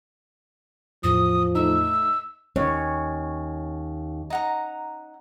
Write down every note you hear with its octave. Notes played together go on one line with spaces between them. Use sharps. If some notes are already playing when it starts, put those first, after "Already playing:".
E2 A2 F3 D#6
A3 D#4 E6
D#2 C#4 C#5
D#4 F#5 A#5